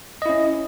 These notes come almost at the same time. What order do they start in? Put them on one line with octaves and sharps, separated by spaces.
D#5 E4 C#4